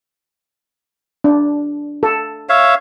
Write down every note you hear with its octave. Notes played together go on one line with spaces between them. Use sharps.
D4
A4
C#5 E5 F5